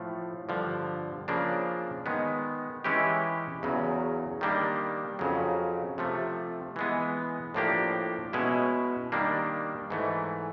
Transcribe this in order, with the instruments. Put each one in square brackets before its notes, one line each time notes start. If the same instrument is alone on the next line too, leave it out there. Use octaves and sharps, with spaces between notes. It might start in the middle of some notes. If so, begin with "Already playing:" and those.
Already playing: [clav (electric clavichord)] A2 F3 A3
G2 D3 F3
C#3 F3 A#3 D4
D#3 G#3 B3
E3 G#3 C#4 E4 G4
E2 C#3 F#3
D#3 G3 A#3 D4
F2 C#3 F#3
C3 F3 A3
E3 G#3 B3
A2 F3 A#3 D4 G4
B2 G#3 C#4 E4
D#3 G3 A#3 D4
G#2 E3 A3